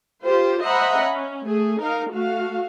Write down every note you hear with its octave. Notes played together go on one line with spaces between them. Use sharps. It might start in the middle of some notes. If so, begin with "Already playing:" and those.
F4 G4 C5
C5 D#5 E5 F#5 A#5 B5
C#4
A3 G#4
D#4 A#4 F5
A3 F#4 F5